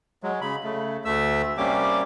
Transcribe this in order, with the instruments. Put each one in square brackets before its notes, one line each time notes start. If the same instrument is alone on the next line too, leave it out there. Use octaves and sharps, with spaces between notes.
[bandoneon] F#3 G#3
C#3 B5
C#3 A3
D2 A3 E5 E6
C3 G3 A#3 C#4 G4 D6